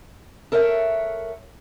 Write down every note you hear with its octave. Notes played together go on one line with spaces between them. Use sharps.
A4 A#4 C#5 E5 F#5